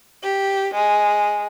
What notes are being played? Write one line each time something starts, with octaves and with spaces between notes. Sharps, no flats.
G4
G#3